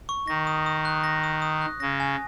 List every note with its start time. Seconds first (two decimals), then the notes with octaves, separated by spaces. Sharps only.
0.09 C#6
0.27 D#3 A#6
0.47 D#6
0.66 D#6
0.85 F#6
1.04 A#6
1.24 D#6
1.42 D#6
1.61 F#6
1.80 C#3 A#6
2.00 G#5